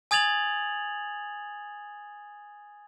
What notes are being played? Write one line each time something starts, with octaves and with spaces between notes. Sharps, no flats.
G#5 D#6 G#6 A6 F7 F#7